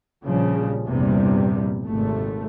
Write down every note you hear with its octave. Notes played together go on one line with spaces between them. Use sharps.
A#1 C#3 F3 G3
A#1 E2 G2 C3 G3
G#1 C3 A3